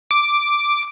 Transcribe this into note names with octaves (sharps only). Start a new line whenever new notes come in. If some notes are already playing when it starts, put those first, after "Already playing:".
D6